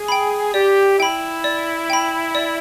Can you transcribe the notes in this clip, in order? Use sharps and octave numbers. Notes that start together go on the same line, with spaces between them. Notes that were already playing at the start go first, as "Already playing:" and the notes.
Already playing: G#4
G5 B5
G4 D5
E4 G5 B5
D5
G5 B5
D5